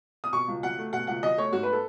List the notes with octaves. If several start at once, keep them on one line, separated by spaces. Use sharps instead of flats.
D#6
B2 C#6
C#2
F#3 F#5
A3
B2 F#5
C#2 F#5
F#3 D#5
A3 C#5
G#2 F#4
B4
A4